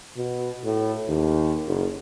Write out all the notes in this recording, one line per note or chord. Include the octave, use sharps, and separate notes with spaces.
B2
A2
D#2
F#1